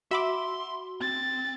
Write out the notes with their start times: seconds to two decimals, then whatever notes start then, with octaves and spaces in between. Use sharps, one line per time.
0.11 F#4 E5 B5 C6 D6
1.01 C4 A6